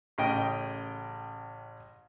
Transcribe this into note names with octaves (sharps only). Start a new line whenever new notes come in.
A1 C#3 D#5 G5